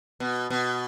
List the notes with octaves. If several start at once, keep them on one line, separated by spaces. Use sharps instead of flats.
B2
B2